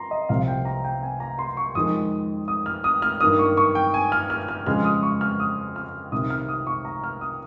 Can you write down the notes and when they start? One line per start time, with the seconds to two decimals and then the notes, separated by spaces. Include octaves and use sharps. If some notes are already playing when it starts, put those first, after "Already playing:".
Already playing: A#5 C6
0.11 D#5
0.29 C2 C3 F3 F5
0.48 G5
0.65 A#5
0.84 G5
1.03 G#5
1.20 A#5
1.39 C6
1.57 C#6
1.75 F2 D#3 G#3 D#6
2.48 D#6
2.66 F6
2.84 D#6
3.02 F6
3.20 G2 D#3 A#3 D#6
3.39 C#6
3.57 C#6
3.75 G5
3.94 G#5
4.12 F6
4.30 F6
4.48 F6
4.66 F2 C#3 G#3 F6
4.85 D#6
5.03 C#6
5.21 F6
5.40 D#6
5.76 F6
6.12 C2 C3 D#3 D#6
6.30 F6
6.49 D#6
6.67 C#6
6.85 A#5
7.04 F6
7.21 D#6